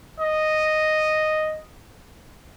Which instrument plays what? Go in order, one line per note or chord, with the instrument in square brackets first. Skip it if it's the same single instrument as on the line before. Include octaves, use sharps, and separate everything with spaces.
[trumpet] D#5